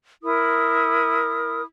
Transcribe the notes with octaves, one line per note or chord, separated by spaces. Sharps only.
E4 A#4 D#6